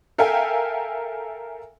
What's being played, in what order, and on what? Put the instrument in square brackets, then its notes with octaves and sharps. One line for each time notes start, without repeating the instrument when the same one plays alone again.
[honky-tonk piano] A4 A#4 E5 F5 G5 G#5